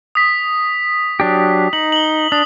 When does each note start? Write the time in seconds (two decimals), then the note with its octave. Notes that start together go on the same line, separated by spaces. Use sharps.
0.15 D#6 B6
1.20 F#3 D4 G4
1.73 D#4 F#7
1.92 F#7 G7
2.32 D4 D#6